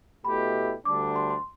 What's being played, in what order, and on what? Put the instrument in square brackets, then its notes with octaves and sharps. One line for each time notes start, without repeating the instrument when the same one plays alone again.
[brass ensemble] B2 A3 E4 G4 [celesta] B5
[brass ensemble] D2 D3 G3 D4 [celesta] D6
[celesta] C6
C6